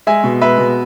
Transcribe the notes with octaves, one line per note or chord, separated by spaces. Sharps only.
G#3 E5 G#5
B2
G#3 B4 E5
B2